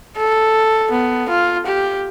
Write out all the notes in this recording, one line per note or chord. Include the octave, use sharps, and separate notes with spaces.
A4
B3
F4
G4